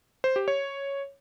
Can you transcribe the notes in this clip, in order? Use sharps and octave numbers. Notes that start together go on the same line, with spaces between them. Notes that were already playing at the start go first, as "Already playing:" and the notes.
C5
G4
C#5